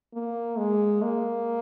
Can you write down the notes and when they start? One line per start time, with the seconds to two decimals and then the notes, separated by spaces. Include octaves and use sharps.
0.14 A#3
0.58 G#3
1.03 A#3